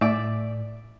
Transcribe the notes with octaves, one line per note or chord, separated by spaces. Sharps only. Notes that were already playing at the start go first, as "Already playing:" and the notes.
A2 D5 E5